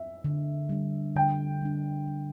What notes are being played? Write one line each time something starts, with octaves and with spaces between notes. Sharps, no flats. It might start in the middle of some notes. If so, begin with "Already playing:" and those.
Already playing: E5
D3
G3 D4
D3 G5
G3 D4
G3